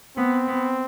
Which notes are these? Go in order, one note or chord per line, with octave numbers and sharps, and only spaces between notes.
B3 C4
B3